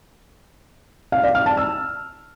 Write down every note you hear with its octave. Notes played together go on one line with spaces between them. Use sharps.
F5
D5
F6
A5
E6